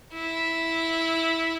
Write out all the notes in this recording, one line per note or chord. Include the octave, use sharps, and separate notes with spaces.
E4